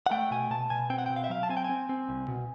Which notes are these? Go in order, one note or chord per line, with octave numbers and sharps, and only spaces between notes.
F#5
A3 G5
B2 G#5
B2 A5
B2 G#5
C4 G5
F#5
B2 G5
F5
E5
F#3 F5
A5
C4 G#5
G5
C4 G#5
C4
C2
B2